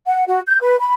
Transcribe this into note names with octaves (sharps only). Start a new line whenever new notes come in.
F#5
F#4
G6
B4
B5